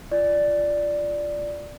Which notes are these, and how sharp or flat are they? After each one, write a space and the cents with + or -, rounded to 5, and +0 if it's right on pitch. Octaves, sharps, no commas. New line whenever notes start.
F4 -20 D5 +0